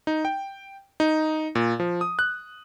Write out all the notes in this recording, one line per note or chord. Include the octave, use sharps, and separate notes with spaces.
D#4
G5
D#4
A#2
F3
D#6
F#6